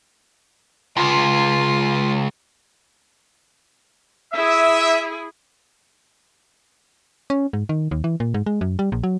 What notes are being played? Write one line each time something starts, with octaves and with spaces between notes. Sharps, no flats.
C#2 F4
E4 G#4 E5
C#4
G#2
D#3
D#2
E3
A#2
G#2
G#3
F#2
G3
A#1
F#3